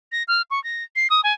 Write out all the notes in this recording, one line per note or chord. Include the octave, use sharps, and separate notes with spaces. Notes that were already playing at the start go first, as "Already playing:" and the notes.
A#6
F6
C#6
A#6
C7
D#6
G#5